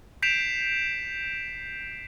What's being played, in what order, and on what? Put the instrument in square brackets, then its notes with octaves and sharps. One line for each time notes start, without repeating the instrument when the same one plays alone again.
[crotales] G6 B6 C7 D7 E7 F7